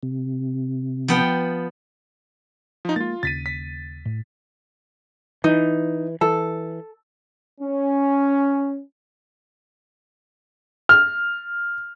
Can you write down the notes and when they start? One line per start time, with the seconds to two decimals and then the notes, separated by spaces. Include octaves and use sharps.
0.03 C3
1.08 F3 B3 G5
2.85 F3 D#4
2.96 G#3 A#3 F4 A6
3.23 D#2 C#3 A6 B6 D#7
3.46 B6
4.05 A2
5.44 E3 D#4
6.21 E3 A4
7.61 C#4
10.89 F6